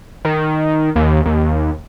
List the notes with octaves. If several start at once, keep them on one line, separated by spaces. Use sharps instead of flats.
D#3
D#2
D#2